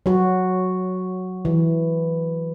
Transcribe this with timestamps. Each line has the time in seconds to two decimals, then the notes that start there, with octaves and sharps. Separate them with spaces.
0.06 F#3 F#4
1.45 E3